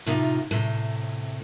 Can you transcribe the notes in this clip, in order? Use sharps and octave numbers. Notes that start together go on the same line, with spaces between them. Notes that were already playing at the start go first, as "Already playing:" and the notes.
A2 C3 D#4 F4
A2 C3